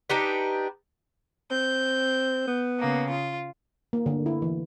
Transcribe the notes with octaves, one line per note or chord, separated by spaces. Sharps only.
D4 D#4 G4 B4
C4 G6
B3
C#3 A#3
F4
A#3
D3
E4
E3